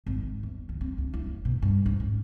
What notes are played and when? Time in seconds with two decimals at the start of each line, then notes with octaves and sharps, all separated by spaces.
0.06 G#1
0.20 D#3
0.43 E2
0.69 D#3
0.81 C4
0.98 D2
1.14 E4
1.26 F#1
1.45 B2
1.62 G2
1.86 G#2
2.00 C#4